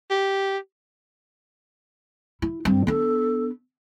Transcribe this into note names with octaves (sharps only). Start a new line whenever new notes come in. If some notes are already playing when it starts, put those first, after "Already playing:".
G4
E4
G2 C4
B3 D4 A4